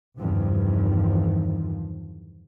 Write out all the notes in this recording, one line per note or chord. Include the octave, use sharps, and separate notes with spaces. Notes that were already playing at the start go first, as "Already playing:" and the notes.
E2 G2 C3 D#3 F3